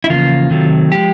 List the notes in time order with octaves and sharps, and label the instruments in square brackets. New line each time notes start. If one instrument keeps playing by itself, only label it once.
[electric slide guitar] E4
E2 C#3 F3 A#3 F4
C3 D#3 F#3 A3
F3 G#3 G4